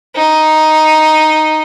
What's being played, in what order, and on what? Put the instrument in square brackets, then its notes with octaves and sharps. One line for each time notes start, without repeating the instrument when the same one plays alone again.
[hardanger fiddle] D#4